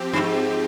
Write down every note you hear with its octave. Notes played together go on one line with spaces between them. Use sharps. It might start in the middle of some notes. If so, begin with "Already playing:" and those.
Already playing: F3 C4 G4
G2
G#2